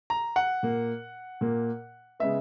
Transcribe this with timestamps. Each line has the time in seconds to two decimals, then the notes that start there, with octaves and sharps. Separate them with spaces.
0.10 A#5
0.36 F#5
0.63 A#2 A#3
1.41 A#2 A#3
2.20 C#3 G#3 B3 E5